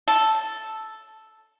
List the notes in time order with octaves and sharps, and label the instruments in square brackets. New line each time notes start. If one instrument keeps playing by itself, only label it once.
[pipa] A4